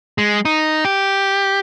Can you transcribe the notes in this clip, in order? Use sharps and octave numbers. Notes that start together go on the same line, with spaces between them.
G#3
D#4
G4